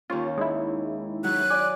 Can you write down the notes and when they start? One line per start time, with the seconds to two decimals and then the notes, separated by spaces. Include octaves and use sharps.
0.10 D#2 C#4 F4 C#5
0.38 G#3 D#4 E4
1.24 F#3 F#6
1.50 D5 G#5 D6